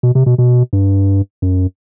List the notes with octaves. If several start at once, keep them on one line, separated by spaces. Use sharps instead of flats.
B2
C3
B2
B2
G2
F#2